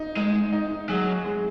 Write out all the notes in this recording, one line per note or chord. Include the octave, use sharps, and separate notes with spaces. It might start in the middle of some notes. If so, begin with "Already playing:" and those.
Already playing: D#4
G#3 D#4
D#4
F#3 G#4
G#3